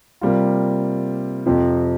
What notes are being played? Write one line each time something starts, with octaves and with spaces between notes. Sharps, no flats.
C3 G3 A#3 F4
F2 C3 F3